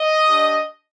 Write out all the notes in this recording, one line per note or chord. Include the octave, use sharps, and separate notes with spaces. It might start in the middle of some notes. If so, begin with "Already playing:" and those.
Already playing: D#5
D4 G4